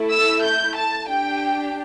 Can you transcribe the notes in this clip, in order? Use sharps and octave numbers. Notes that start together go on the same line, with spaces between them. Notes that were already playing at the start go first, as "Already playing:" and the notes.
Already playing: A3 E4 A4
E6
G6
A5
D4 G4 G5